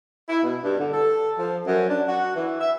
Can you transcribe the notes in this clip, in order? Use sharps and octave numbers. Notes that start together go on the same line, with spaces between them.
E4
B2
G2
D3
A4
F3
F#2
D4
F#4
E3
E5